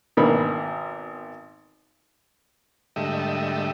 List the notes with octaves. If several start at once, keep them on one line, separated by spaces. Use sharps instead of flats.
G#1 B2 E3 A#3 D4 B5
G#2 D3 G3 A3 D#5 E5